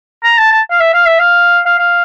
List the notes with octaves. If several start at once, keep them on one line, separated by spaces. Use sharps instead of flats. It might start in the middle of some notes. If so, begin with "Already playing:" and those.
A#5
A5
A5
F5
E5
F5
E5
F5
F5
F5